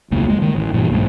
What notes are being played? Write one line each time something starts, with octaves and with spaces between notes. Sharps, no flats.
E1 C#2 F#2 A#3
G#3
D#3
A1
G2 A#2 E3
B1 G#2